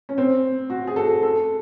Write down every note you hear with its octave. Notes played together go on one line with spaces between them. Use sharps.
C#4
C4
F#4
G#4
A4
A4